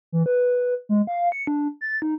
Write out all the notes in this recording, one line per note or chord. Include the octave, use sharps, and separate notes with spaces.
E3
B4
G#3
F5
C#7
D4
A6
D#4